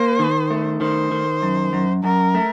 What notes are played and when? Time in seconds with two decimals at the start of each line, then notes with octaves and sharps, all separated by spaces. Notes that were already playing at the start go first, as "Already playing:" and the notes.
Already playing: A#3 C5
0.19 D#3
0.51 A3
0.81 D#3 C5
1.12 D#3
1.42 F#2
1.73 F#2
2.04 F#2 A#4
2.35 A3